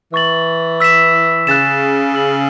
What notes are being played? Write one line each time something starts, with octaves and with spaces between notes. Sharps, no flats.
E3 C#6 A6 F#7
E6 B6 E7
C#3 F#6 A6 E7
E6 A6 F#7